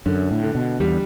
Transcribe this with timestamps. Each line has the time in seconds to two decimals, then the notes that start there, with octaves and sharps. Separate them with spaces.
0.06 F#2 D3
0.31 A2
0.43 D3
0.55 B2
0.80 E2 G3